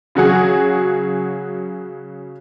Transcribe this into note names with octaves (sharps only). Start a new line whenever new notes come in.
C#3 F#3 F#4 G#4